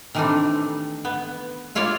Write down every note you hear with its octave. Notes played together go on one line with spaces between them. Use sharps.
D#3 E3 G3 A3 C4 D4
B3
E4 F4 C#5 D5 E5 F5